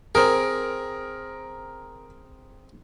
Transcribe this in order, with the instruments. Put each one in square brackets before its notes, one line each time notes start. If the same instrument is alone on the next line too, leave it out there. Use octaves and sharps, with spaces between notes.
[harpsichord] C4 G#4 [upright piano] A#4